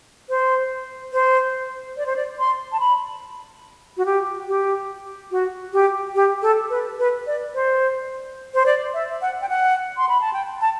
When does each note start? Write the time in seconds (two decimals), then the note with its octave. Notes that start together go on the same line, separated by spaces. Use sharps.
0.29 C5
1.13 C5
1.97 D5
2.06 C5
2.16 D5
2.39 C6
2.72 A5
2.80 B5
3.97 F#4
4.06 G4
4.48 G4
5.31 F#4
5.73 G4
6.15 G4
6.42 A4
6.70 B4
6.99 B4
7.27 D5
7.54 C5
8.54 C5
8.66 D5
8.94 E5
9.22 F#5
9.42 G5
9.49 F#5
9.97 C6
10.09 B5
10.21 A5
10.33 G5
10.61 A5